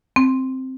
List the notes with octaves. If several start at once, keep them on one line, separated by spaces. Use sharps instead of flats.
C4